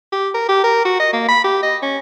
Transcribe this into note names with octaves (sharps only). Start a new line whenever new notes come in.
G4
A#4
G4
A#4
F#4
D#5
A#3
B5
G4
D#5
C#4